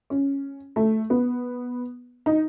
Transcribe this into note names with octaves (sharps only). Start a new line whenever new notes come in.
C#4
A3
B3
D#4